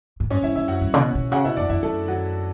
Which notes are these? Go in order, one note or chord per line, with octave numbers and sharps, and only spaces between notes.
A2
G2 C#4 C#5
G2 E4 E5
G2 E4 E5
F#2 F#4 F#5
G2
C#3
B2
B2
C#3 F#4 F#5
B2 E4 E5
F#2 D4 D5
F#2 E4 E5
F#2 A3 A4
F#3 F#4